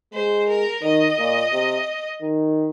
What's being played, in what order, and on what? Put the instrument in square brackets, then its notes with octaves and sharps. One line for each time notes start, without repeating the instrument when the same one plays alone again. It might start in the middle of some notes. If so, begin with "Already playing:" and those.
[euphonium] G#3 [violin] C5
[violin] A#4
[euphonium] D#3 [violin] D#5
[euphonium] A#2
C3
D#3